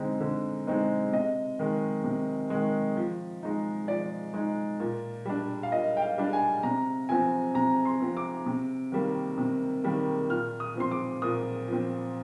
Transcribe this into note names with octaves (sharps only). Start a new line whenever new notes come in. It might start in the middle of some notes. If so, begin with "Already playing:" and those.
Already playing: D3 G#3 C4 D#4
D3
G#3 C4 D#4
C3 D#5
D#3 G#3
C3
D#3 G#3
F3
G#3 D#4
F3 D5
G#3 D#4
A#2
G3 D4
F5
A#2 D#5
G5
F5
G3 D4
G#5
C3 A#5
F3 C4 G#5
C3 A#5
C6
F3 C4
D6
C3
D#3 G3 A#3
C3
D#3 G3 A#3
A#2 F6
D#6
F3 C4 C6
D6
A#2 D#6
F3 C4